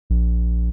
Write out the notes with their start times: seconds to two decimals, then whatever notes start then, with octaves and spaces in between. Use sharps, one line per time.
0.10 A#1